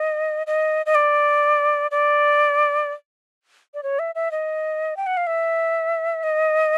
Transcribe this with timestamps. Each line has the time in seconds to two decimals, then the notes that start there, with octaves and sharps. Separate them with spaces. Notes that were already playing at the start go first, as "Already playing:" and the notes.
Already playing: D#5
0.47 D#5
0.86 D#5
0.95 D5
1.91 D5
3.74 D5
3.83 C#5
3.99 E5
4.15 E5
4.31 D#5
4.97 G5
5.06 F#5
5.17 F5
5.27 E5
6.23 D#5